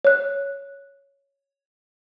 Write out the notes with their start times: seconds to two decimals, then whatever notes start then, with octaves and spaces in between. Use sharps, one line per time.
0.05 C#5 F#6